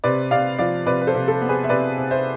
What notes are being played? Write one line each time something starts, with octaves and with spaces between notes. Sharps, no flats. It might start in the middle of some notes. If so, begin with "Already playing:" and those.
C3 B4 D5
C3 D5 F5
F3 D5 F5
C3 B4 D5
B4
A4 C5
C3
A4
B3
G#4 B4
E5
C3 B4 D5
C3
C5 E5